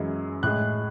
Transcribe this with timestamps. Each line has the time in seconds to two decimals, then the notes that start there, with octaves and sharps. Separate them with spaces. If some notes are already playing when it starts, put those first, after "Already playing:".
Already playing: F#2 E3 G#3
0.43 A2 G#3 F#6